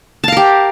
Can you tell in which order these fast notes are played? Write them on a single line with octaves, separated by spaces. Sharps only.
A5 F5 A#4 G4